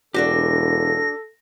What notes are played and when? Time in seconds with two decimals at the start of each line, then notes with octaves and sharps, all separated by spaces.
0.14 E1 D4 F#4 G4 A4 A#6